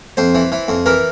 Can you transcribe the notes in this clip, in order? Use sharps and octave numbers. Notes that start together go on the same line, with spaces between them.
F2 C5
E3
E3
F2
E3 A#4